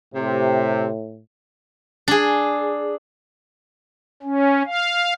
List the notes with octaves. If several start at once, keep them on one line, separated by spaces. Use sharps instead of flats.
A2 C3
D4 G#4
C#4
F5